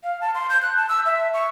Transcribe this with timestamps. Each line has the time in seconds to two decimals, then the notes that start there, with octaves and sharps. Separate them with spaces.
0.04 F5
0.21 A5
0.35 C6
0.50 G6
0.62 F#6
0.77 A5
0.89 E6
1.06 E5
1.34 C#6